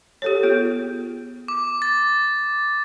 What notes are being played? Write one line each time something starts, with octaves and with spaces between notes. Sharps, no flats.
G4 A4 C#5
B3 F4 G#4
D6
A6